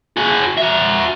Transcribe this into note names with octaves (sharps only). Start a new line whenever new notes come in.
F#4 G#4
F#4 E5